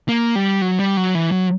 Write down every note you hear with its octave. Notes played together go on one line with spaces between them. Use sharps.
A#3
G3
F#3
G3
F#3
E3
F#3